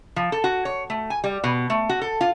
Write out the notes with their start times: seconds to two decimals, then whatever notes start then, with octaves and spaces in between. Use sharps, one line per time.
0.16 F3
0.32 A4
0.44 F#4
0.65 C#5
0.90 A3
1.10 G#5
1.24 G3
1.44 B2
1.70 A3
1.89 F#4
2.01 A4
2.21 F4